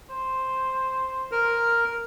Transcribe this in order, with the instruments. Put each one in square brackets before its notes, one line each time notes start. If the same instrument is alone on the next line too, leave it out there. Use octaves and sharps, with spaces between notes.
[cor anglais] C5
[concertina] A#4